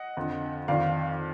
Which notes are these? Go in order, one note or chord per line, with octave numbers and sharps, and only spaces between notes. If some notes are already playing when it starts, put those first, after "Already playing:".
Already playing: D#5 F#5
F2 D3
F2 D#3 D5 F5